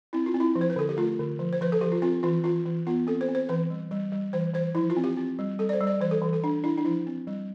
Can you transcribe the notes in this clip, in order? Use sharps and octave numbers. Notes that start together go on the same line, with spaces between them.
C4 E4
F4
C4
E4
F3
C5
B4
D3 A4
G4
A3 F4
D3
F3
C5
F3 B4
A4
F3 G4
F4
C4 F4
E3 F4
E3 F4
E3
B3 F4
C4 A4
C5
C4
C5
E3 B4
G3
G3
G3
E3 C5
E3 C5
F3 E4
F4
C4
G4
C4
G3
G3 A4
D5
C5
G3
D5
E3 C5
A4
E3
A4
D4
D4 E4
D4
F3 E4
C4
G3